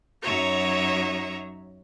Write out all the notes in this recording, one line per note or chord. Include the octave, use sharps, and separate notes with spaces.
F#2 F#3 D#4 C#5 E5 A#5